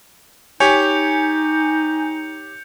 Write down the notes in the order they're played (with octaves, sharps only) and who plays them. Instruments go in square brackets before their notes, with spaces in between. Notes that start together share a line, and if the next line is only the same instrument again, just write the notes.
[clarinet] D#4 [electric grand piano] G4 C#5 [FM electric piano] G#5 [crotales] G6 C#7 F7